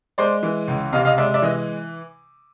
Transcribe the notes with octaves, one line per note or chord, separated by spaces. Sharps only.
G#3 C5 D5
E3
C#2
C3 D#5 F5
D#5 F5
G#3 D5 E5
D5 E5
E3 D#5